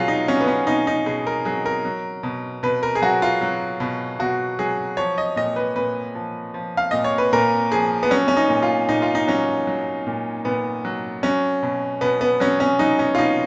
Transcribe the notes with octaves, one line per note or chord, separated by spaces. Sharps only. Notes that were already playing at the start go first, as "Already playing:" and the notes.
Already playing: B2 F#3 F4 G#4
D#4
F#3 C#4
B3
C#4
B2 D#4
D#4
B2 G#4
A#4
F#3 G#4
A#4
F#3
B2
B2 B4
A#4
G#4
F#3 F#4
F4
F#3
B2
B2 F#4
F#3 G#4
F3 C#5
D#5
A#2 D#5
B4
A#2 B4
F3
F3
F5
A#2 D#5
C#5
B4
A#2 A#4
F3 G#4
B3
F#3 C#4
C#4
D#4
A#2
F4
A#2 D#4
F4
D#4
F#3 C#4
F#3
A#2
A#2 B3
F#3
F#3 C#4
B2
B2 B3
B3
F#3 C#4
C#4
F#3 D#4
C#4
F4
B2 D#4